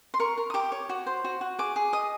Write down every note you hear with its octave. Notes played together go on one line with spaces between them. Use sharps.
C6
A#4 C#6
A#4
D#6
G4 D6
C#5
F#4
C5
F#4
F#4
G#4 D6
G#4
D#5 D#6